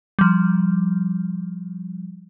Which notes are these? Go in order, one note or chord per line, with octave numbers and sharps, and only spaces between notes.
F3 G3